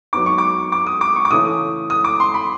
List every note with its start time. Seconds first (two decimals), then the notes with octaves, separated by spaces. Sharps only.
0.13 F#3 B3 D#4 D6
0.26 C#6
0.38 D6
0.72 D6
0.87 D#6
1.01 D6
1.16 C#6
1.25 D6
1.31 C#3 E3 A3 C#4 D#6
1.90 D#6
2.04 D6
2.20 C6
2.34 B5